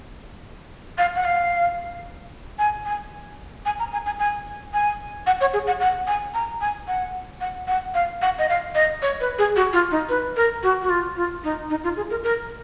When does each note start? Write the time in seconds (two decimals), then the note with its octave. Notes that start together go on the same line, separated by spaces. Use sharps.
0.98 F5
1.16 F#5
1.25 F5
2.59 G#5
2.86 G#5
3.66 G#5
3.80 A#5
3.93 G#5
4.06 G#5
4.19 G#5
4.74 G#5
5.27 F#5
5.41 C#5
5.53 G#4
5.67 F#5
5.80 F#5
6.07 G#5
6.34 A#5
6.61 G#5
6.88 F#5
7.41 F#5
7.68 F#5
7.94 F5
8.22 F#5
8.39 D#5
8.49 F5
8.75 D#5
9.02 C#5
9.21 B4
9.38 G#4
9.56 F#4
9.73 F4
9.91 D#4
10.09 B4
10.36 A#4
10.63 F#4
10.82 F#4
10.90 F4
11.16 F4
11.44 D#4
11.70 D#4
11.84 F4
11.97 G#4
12.10 A#4
12.24 A#4